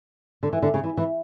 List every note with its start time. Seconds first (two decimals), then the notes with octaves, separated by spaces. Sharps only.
0.43 D3
0.53 E3
0.62 D3
0.74 C#3
0.84 E3
0.97 E3